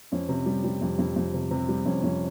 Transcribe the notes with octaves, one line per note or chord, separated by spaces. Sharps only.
F2 C#4
C3
G3
G3
F2
F2
F2
C3
C3 C4
G3
F2 C#4
F2 C#4